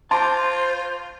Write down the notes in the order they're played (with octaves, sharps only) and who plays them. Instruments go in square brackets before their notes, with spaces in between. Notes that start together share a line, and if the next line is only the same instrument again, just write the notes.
[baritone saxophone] F4 [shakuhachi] C5 [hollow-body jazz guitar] A5 [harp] C6 D6 A#6